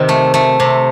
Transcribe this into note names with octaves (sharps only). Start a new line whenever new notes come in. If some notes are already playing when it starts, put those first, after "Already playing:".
Already playing: C3 D#3
A3
A3
C3